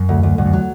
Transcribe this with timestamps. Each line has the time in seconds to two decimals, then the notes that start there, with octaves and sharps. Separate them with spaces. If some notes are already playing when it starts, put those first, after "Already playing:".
Already playing: F#2
0.09 D2
0.23 D2
0.38 D2 G2
0.46 F#2
0.53 F#3